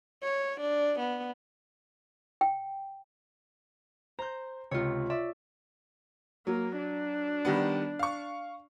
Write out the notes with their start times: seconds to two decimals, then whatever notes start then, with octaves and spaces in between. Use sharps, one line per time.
0.22 C#5
0.60 D4
0.99 B3
2.41 G5
4.19 C5 A#5 G6
4.71 C#2 C3 F4 C#5
5.10 D5 E5
6.47 F#3 A#3
6.78 D4
7.45 D#3 G3 B3
7.99 F5 C#6